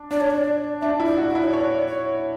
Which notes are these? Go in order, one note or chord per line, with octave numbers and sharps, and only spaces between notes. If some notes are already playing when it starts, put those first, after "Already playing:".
Already playing: D4
D4 D5
C#5
D5
D4 E5
E4
D5
F#4
D5
E4
C#5
C#5 D5
C#5